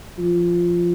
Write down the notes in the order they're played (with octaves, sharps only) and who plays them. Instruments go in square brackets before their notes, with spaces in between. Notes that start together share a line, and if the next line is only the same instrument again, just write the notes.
[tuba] F3